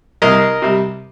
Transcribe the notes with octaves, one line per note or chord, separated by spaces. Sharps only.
C2 A#4 D#5
C3 G3